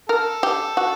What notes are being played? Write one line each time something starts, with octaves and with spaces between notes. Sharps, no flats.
A4 A#4
G4
F#4